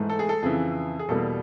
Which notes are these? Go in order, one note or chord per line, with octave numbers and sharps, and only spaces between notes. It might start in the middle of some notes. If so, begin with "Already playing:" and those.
Already playing: G#2 E3 A3
A4
G#4
A4
F2 C#3 E3 G#4
G#4
E2 B2 G3 A#3 A4